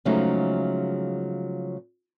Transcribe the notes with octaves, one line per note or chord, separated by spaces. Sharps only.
C#3 F3 F#3 G#3 A3 D#4